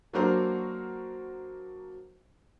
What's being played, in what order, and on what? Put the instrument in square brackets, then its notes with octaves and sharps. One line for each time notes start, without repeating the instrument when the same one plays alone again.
[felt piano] F#3 A#3 D4 F#4 A#4 C5